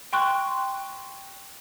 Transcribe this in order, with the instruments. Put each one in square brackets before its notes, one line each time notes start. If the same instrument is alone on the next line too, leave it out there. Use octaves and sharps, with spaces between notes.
[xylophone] G5 C6 C#6 F#6